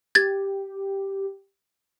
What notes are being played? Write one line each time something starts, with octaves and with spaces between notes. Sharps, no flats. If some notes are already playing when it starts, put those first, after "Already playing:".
G4 G#6 A6